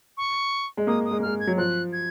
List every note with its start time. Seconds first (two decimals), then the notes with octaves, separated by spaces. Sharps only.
0.17 C#6
0.77 G#3
0.87 A#3 D#6
1.05 D#6
1.11 G#3
1.19 A#3
1.22 G#3 F6
1.40 G#6
1.47 F#3
1.58 F3 F#6
1.93 G#6